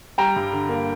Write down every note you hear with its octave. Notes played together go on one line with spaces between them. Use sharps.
G3 G5 A#5
G2
D3
A#3